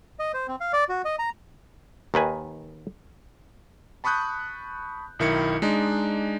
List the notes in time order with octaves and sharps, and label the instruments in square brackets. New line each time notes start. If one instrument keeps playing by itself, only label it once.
[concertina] D#5
C5
C4
F5
D5
F#4
D#5
A#5
[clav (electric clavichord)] D#2 D#3 B4 G#5
[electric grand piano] A5 B5 C#6 D#6 F#6 G6
B1 D#3 E4 A#4 C#7
G#3 D4 D#4